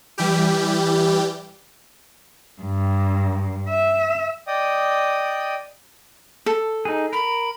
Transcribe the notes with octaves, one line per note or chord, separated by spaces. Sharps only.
E3 G3 G4
G2
E5
D5 D#5 G5 D#6
A4
D#4 G#4
A#4 B5